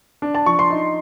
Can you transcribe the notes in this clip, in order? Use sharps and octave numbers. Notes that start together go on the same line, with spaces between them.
D4
A5
F3 C#6
C6
D#4